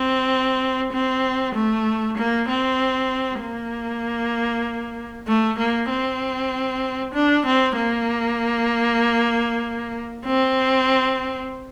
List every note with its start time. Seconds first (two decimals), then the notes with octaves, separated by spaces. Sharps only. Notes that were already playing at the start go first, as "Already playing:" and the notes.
Already playing: C4
0.92 C4
1.55 A3
2.17 A#3
2.48 C4
3.41 A#3
5.28 A3
5.58 A#3
5.90 C4
7.14 D4
7.46 C4
7.76 A#3
10.26 C4